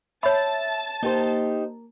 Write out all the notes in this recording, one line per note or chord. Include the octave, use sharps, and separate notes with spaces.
C#5 E5 A5 B5
A#3 D#4 G4 C5